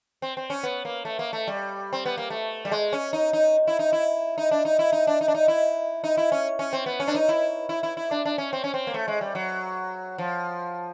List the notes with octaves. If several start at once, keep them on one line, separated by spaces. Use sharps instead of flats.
C4
C4
C#4
B3
A#3
A3
A#3
A3
G3
C4
B3
A#3
A3
G3
G#3
C#4
D#4
D#4
E4
D#4
E4
D#4
D4
D#4
E4
D#4
D4
D#4
D4
D#4
E4
D#4
E4
C#4
C#4
C4
B3
C#4
D4
D#4
E4
E4
E4
E4
D4
D4
C#4
C4
C#4
C4
A#3
A3
G#3
G3
F#3
F3